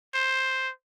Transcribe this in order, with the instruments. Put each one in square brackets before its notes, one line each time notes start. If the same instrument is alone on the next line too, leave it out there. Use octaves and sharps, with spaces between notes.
[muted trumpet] C5